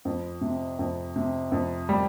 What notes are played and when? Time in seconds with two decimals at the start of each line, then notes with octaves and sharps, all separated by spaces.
0.05 F2
0.41 C3
0.79 F2
1.16 C3
1.52 F2
1.89 G3